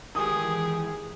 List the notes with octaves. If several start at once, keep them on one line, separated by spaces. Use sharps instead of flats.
D#3 E3 G#3 G4 G#4 D#6